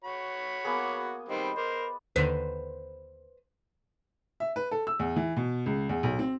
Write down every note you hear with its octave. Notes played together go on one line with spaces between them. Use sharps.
F#4 C#5 B5
A#3 B3 G#4
D#3 G3 C4 B4 D#5
A#4 C5 D5
D#2 D3 D#3 B4 C5
E5
B4
A4
E6
E2
E3
B2
C#2
E2
B1
C4